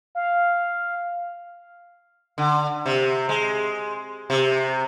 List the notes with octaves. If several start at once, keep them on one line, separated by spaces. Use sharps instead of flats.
F5
D3
C3
G#3
C3